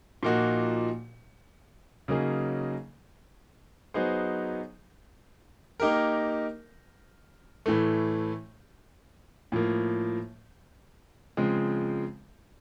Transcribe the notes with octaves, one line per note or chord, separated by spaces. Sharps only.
A#2 F3 A#3 D#4 F#4
C#3 F#3 A#3 D#4 G#4
F#3 B3 D#4 G#4 C5
A#3 D#4 G4 A#4
A2 E3 A3
A2 F3 A#3
C#3 F3 G#3 C4